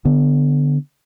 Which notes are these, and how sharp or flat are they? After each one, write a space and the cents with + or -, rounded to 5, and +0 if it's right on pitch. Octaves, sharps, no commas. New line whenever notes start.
D3 +0 B3 +0